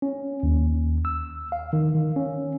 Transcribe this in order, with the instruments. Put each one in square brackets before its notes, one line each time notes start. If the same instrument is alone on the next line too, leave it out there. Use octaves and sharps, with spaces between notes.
[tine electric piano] C#4
D#2
E6
F5
D#3
D#3
C#4